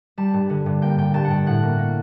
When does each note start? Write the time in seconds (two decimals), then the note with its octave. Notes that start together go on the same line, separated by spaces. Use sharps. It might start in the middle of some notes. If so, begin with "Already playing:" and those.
0.17 G3 A5
0.34 G2
0.50 D3
0.66 G2
0.82 A#3 G5
0.98 G2 G5
1.14 G2 A5
1.24 F#5
1.30 G2 G5
1.46 A2 F#5
1.63 A#3
1.79 A#3